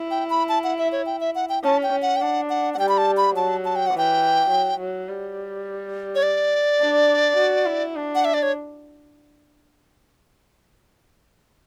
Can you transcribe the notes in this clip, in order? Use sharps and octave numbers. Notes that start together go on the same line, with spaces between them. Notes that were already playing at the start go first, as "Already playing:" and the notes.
Already playing: E4
G5
B5
A5
F#5
E5
C#5
G5
E5
F#5
G5
C#4 A5
G5
C#4
F#5
G5
D4 F#5
F#5
F#5
G3 G5
B5
A5
B5
F#3 A5
A5
G5
F#5
E3 G5
F#3
F#3
G3
C#5
D5
D4
F#4
E4
D4
F#5
E5
D5
C#5